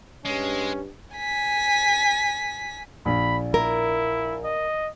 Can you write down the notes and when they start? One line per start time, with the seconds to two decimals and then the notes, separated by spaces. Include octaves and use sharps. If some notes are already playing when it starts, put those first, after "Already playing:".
0.25 G2 G#3 C#4
1.17 G#5 B6
3.06 A#1 B5
3.54 E4 A#4
4.44 D#5